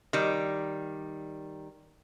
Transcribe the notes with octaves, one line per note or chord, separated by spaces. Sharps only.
D#3 G3